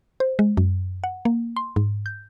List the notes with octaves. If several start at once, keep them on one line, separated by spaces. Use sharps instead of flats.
C5
G#3
F#2
F#5
A#3
C6
G#2
G6